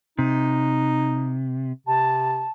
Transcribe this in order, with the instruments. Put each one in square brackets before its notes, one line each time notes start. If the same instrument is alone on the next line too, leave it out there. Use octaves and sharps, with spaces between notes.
[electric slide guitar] C3 [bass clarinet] D#4
[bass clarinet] C3 [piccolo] A5